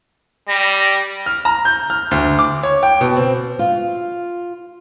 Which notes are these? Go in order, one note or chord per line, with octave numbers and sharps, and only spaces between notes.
G3 A#6
F6
A#5
G6
F6
D2
D6
C#5
G5
B2
C4
F4